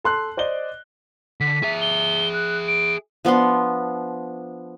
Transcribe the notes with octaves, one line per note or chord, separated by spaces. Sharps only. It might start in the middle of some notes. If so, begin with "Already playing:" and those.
A4 C6 F#6
C5 D5 D#5 G7
D3 B6
G#4 E5
G7
F#6
D7
F3 B3 D4 C6